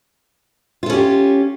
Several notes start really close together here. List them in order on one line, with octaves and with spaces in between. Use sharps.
F4 A4 C#4 G4